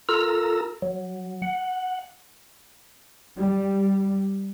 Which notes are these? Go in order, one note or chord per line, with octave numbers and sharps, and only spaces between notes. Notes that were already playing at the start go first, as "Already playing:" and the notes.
F4 A4 A#4 A#5 E6
F#3
F#5
G3